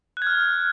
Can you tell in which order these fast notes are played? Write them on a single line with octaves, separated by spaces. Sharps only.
F#6 G#6 F6